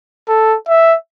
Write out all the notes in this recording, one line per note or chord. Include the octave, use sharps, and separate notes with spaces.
A4
E5